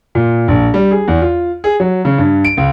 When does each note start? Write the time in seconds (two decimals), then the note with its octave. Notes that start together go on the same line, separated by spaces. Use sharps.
0.15 A#2
0.48 A#1
0.74 G3
0.91 G#4
1.08 E2
1.22 F4
1.64 G#4
1.80 F#3
2.05 C#3
2.18 G2
2.45 D7
2.57 C#2